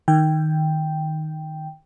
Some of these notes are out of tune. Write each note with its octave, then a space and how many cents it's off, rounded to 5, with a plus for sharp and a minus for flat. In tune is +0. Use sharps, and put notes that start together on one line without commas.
D#3 +0 G5 +0